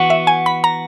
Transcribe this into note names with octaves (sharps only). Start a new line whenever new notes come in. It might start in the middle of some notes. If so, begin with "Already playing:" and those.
Already playing: E3 B3 F#4
E5
G#5
B5
A#5